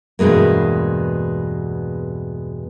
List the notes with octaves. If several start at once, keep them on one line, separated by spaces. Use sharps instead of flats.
E2 G2 B2 G#3 A#3